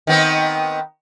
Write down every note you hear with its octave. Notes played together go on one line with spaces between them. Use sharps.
D#3 B3 C4